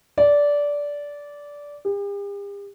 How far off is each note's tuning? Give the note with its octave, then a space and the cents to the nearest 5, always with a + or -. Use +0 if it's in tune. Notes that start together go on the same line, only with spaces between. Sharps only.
D5 -15
G4 +45